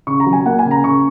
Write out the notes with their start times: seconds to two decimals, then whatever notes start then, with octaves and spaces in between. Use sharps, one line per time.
0.07 C#3 C#6
0.20 A#5
0.26 F#3
0.33 G#5
0.45 A#3 F#5
0.59 G#5
0.65 C#3
0.71 A#5
0.84 C#3 C#6